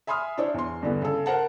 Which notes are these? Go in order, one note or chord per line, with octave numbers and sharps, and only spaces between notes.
E5 G#5 B5 C6 D#6 F6
D4 E4 C5 C#5
E2 C6
G2 D3 E3 B3
C#3 A4
A#4 C5 F#5 A5